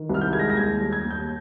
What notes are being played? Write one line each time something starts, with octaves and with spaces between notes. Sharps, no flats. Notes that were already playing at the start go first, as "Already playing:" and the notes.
Already playing: D#3
C2 F6
G6
G#3 G#6
A#6
A#6
D#2 G#6
G3
G#6
D#2
G6